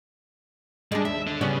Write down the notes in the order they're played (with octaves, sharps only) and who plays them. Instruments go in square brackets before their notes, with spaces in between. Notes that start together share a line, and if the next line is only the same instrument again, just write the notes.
[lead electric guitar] G3 [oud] G#3 D4
[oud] D#2 [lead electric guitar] E5
[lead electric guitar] D4 A4
[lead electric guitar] C#3 [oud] G3 B3 C#4